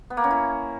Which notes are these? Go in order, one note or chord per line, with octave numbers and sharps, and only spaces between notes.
B3
A#3
C#4
E4